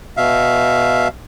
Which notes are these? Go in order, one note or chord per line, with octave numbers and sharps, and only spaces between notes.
B2 E5 F5